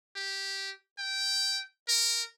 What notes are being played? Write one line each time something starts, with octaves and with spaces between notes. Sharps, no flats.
G4
G5
A#4